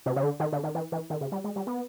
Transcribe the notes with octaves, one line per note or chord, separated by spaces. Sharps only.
C3
C#3
D3
D#3
D3
D#3
E3
E3
D#3
C#3
G3
G#3
G3
B3